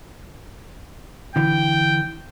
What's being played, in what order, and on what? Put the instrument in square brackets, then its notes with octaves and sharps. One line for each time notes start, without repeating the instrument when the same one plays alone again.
[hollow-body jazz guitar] D3 E3 [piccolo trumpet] G5